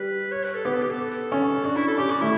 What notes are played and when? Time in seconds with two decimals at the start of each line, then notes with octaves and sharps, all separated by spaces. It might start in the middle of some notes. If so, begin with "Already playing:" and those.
Already playing: G3 B4
0.32 C#5
0.44 B4
0.54 A4
0.65 B3 G4
0.74 A4
0.82 G4
0.91 A4
1.32 C#4
1.65 D4 F#4
1.76 E4
1.87 A4
1.98 C#4 G4
2.10 F#4
2.21 A3 E4